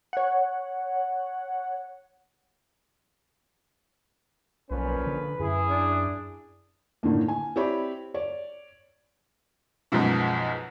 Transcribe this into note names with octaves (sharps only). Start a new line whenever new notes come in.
C#5 F#5
B1 A#2 F3 C#4 B4
D3
F#2 E4 G#4
D4
A2 D3 D#3 A#3
G#5
C4 E4 G4 C#5 D5 B5
C#5 D5
B1 F#2 B2 F3 G#3